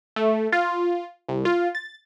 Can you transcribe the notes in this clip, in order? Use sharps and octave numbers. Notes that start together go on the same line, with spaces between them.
A3
F4
C2
F4
A6